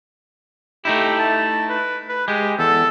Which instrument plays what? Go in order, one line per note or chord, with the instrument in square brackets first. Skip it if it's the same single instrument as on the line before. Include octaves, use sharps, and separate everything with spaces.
[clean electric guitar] A3 D#4 E4 [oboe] G4
[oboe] A5
B4
B4
[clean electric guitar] G#3 [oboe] G4
[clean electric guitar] E2 [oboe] A4